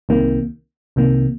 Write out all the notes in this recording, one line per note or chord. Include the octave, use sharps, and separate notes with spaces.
C2 C3 D#3 A#3
C2 C3 D#3 A#3